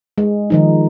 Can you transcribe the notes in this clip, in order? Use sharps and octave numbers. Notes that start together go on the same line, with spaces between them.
G#3
D#3 F3 D#4